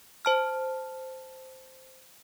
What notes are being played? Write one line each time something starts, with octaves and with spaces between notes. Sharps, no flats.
C5 A5 F6